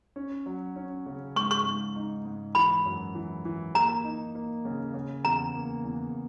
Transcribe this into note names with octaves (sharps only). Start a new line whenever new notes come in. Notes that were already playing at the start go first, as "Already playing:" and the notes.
C#4
F#3
C#4
C#3
G#2 C#6
C#6
G#2
D#4
G#2
E3 B5
F#2
E3
E3
A#3 A#5
D#4
A#3
C#3
C#3
E2 A#5
A#3
E2